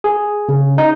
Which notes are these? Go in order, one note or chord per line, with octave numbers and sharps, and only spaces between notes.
G#4
C#3
D#4